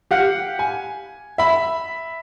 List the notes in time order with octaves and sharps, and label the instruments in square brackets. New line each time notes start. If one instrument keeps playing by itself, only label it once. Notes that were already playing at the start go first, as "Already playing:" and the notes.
[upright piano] G4 F5 F#5
G#5
E5 B5